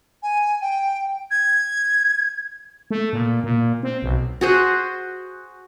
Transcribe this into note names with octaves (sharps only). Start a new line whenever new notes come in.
G#5
G5
G#6
A3
A#2
A#2
C4
B1
F#4 G#4 C5